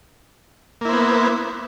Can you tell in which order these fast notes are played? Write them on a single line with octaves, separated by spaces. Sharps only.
A#3 E4 C5 B3